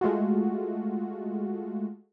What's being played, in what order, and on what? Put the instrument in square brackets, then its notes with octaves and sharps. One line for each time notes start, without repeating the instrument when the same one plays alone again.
[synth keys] G#3 A3 F4 F#4